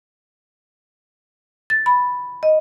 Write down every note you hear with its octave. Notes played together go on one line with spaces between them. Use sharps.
A6
B5
D#5